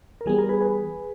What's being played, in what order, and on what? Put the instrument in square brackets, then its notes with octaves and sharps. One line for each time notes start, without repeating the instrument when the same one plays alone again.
[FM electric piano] A#4
E3 G3 B3 G#4
A#4
G#4 B4
G#4 B4